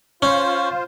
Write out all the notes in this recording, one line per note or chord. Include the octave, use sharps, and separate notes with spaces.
C#4 F4 C5